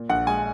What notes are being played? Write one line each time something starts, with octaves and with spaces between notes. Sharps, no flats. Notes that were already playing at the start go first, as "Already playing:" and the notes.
Already playing: A#2
A#1 F#5
G#3 G#5